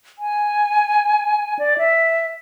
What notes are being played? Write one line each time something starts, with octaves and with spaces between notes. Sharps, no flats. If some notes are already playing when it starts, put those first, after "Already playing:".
G#5
D5
E5